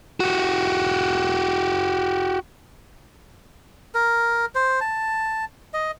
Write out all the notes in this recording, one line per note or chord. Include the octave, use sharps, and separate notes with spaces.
F#4 G4
A#4
C5
A5
D#5